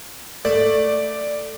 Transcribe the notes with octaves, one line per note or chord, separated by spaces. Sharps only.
A3 D5